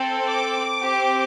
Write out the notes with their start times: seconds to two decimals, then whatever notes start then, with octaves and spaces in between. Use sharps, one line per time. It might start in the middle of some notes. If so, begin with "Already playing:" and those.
Already playing: C4 A4
0.27 D6
0.82 C4 G4